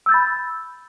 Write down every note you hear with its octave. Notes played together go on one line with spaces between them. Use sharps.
B5 E6 G6 A6